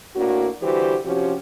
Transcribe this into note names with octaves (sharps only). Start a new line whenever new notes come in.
A2 A#3 D4 F#4
D3 E3 G3 F#4 G4 C5
C3 F3 C#4 F#4 G4